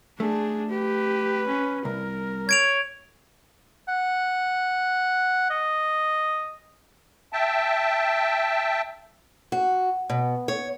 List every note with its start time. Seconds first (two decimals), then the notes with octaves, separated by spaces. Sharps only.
0.20 A3 D4 G#4
0.70 G4 B4
1.47 C#4
1.85 C2 A#4
2.49 C#5 G#6 D7 F7
3.88 F#5
5.50 D#5
7.33 E5 G5 A5
9.52 F#4
10.10 B2
10.48 C#5